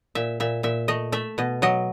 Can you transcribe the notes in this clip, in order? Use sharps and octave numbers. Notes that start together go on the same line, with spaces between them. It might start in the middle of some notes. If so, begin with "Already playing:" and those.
A#2 E5
A#2 E5
A#2 E5
A3 D#5
A3 E5
B2 D#5
F#3 D#5